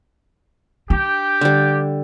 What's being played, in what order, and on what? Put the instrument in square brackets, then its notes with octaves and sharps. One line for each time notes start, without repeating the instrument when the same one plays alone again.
[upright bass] D4 [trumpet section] G4 G5
[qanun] D3 G3